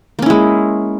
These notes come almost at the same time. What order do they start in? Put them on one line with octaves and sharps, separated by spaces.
A#3 C#4 E4 G#3